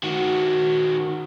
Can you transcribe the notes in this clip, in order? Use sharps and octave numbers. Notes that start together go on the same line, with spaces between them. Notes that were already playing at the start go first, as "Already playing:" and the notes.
D#3 F#4